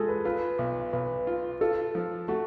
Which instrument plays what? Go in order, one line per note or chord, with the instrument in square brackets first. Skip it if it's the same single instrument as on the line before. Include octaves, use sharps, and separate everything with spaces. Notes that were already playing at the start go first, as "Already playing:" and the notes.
Already playing: [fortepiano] G#3 [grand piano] F4 G#4 A4
[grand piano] B4
[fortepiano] F4 [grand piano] B4
[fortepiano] B1
[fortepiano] B1 [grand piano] B4
[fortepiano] F4
[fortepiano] F4 [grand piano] A4
[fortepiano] F3
[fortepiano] A3 [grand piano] F#4